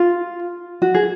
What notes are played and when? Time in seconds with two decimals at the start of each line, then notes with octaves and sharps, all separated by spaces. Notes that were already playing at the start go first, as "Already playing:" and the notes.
Already playing: F4
0.82 F#4
0.94 G#4